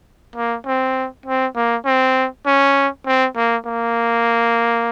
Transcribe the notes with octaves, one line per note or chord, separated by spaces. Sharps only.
A#3
C4
C4
A#3
C4
C#4
C4
A#3
A#3